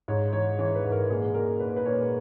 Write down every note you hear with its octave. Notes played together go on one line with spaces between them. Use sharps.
G#2 C#5
E3 C#5
E3 C#5
B4
G#2
A#4
A#2 G#4
A#2 A#4
A#2 B4
B4
A#2 C#5